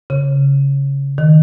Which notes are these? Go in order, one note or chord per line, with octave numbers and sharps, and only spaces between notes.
C#3
D#3